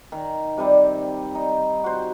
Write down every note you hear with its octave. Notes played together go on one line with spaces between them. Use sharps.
D#3
C3 G3
D#4
F#4 C5